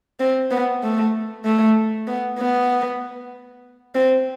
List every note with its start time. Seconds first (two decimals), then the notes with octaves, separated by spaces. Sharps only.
0.20 C4
0.51 B3
0.83 A3
1.45 A3
2.07 B3
2.39 B3
3.95 C4